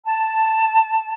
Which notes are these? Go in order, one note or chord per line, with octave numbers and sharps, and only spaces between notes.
A5